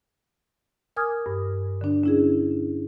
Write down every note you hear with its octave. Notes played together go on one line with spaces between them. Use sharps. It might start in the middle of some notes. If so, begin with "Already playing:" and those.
A#4 G#5 D6 D#6 F6 G#6
G2
D3 D4
C#4 E4 G#4